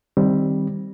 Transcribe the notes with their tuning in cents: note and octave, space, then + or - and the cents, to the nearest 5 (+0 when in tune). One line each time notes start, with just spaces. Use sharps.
D#3 +0 G3 +0 C4 +0